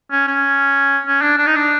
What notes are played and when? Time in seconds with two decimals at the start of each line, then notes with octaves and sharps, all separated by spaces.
0.11 C#4
0.27 C#4
1.06 C#4
1.22 D4
1.38 D4
1.47 D#4
1.56 D4